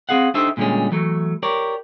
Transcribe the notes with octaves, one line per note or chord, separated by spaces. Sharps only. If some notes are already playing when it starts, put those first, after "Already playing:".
C4 C#4 G#4 F5 F#5
D4 D#4 G4 A4 C5 E5
A#2 D3 G3 G#3 C#4
E3 F#3 A3
G4 A#4 C#5 D5